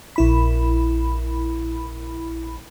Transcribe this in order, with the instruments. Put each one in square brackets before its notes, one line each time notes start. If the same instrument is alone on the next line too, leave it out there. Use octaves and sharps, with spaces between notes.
[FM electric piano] A#1 E4 B5